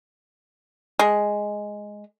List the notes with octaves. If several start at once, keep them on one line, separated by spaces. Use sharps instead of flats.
G#3